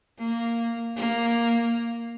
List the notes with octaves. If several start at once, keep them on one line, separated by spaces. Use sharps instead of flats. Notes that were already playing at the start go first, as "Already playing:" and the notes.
A#3
A#3